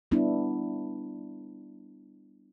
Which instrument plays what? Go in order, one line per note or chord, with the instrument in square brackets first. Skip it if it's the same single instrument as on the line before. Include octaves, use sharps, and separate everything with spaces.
[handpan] G3 B3 D4 E4